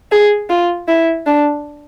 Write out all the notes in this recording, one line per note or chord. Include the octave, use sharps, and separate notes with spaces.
G#4
F4
E4
D4